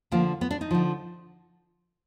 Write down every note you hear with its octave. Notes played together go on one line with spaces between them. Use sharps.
D3 F3 A#3
B3
D4
D#4
D3 F3